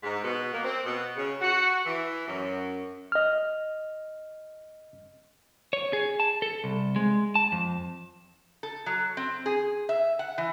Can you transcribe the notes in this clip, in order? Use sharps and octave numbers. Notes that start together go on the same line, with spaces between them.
G#2
B2
A#3
C4
B2
C#3
F#4
E3
F#2
D#5 F6
C#5
G#4
A5
A4
C2
G#3
A5
F2
A4
F#3
C4
G#4
E5
F#5
E3